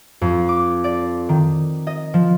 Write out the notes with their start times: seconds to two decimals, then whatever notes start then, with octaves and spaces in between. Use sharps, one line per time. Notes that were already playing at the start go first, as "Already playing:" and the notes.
0.21 F2
0.49 D6
0.84 D5
1.29 D#3
1.87 D#5
2.14 F3